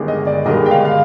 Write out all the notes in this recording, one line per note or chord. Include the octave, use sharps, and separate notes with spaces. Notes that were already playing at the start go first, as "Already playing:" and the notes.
Already playing: G1 G2 D#3 G#3
D#5
D5
G1 G2 D#3 G#3 D#5
G5
F5
F5